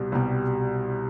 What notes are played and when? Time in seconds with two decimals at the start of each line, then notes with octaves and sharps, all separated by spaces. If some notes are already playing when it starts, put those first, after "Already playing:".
Already playing: C2 B2 G3
0.12 C2 B2 G3